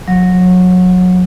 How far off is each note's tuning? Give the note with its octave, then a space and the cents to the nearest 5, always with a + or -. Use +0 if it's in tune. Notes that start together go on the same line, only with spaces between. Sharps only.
F#3 -25